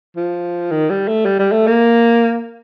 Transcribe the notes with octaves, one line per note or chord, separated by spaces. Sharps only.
F3
D#3
G3
A3
G3
G3
A3
A#3